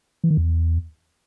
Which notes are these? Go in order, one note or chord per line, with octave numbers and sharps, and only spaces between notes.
E3
D#3
E2